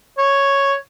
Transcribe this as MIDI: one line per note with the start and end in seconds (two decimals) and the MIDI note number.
0.18 0.75 73